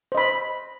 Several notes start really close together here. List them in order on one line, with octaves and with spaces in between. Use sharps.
C5 D#5 B5